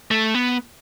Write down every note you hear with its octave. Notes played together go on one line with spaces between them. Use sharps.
A3
B3